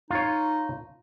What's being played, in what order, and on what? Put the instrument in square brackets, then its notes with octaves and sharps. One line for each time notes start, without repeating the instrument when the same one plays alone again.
[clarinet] D#4 [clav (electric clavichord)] F4 C#5